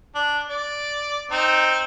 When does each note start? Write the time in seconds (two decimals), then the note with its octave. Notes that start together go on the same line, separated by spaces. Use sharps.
0.15 D4
0.50 D5
1.31 C4 D#4